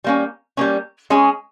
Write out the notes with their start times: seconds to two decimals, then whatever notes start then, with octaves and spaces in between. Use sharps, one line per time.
0.04 G3 A#3 C#4
0.57 G3 A#3 C#4
1.10 G#3 C#4 G#4